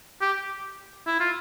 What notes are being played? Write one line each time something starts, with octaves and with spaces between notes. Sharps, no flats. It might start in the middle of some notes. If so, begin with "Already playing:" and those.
G4
E4
F4